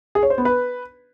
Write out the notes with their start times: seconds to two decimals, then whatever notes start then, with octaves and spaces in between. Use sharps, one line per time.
0.15 G#4
0.23 C#5
0.30 C5
0.38 B3
0.45 B4